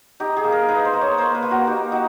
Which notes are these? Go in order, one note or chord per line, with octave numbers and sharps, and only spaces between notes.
D#4 G4
G#4
A#3
A#4
D#4 B4
C5
A#3
C#5
A#3 C5
B4
A#3
F#4
D#4 G4
D#4 F#4